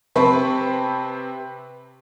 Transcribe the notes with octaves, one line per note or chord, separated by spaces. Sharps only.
C3 C4 B4 A5 B5 C#6